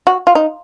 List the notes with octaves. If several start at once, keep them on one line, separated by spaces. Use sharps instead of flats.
F#4
F4
D#4